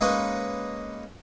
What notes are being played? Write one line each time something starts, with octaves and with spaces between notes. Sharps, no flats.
G#3 A#3 C#4 D#4 B4 C#5